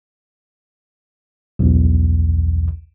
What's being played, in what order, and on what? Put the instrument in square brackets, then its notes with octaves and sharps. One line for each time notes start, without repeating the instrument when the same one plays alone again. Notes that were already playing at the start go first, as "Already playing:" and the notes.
[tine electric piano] B1 E2